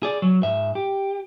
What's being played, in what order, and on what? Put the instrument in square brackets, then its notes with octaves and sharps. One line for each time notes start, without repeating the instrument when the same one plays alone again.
[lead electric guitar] G#4 D5
F#3
G#2 E5
G4